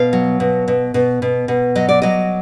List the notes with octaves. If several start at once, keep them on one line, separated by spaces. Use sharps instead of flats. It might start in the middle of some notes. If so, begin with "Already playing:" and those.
Already playing: B2 F5
F#3
B2
B2
B2
B2
B2
F#3 D#5
D5
F#3 D#5